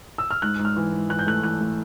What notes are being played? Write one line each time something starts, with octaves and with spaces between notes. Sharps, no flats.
E6
F6
G#2 F#6
G#2
F6
E3
G#2
E3 F#6
G6
A3 F#6
E3 F#6
A3